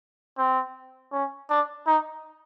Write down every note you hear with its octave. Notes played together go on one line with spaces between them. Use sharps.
C4
C#4
D4
D#4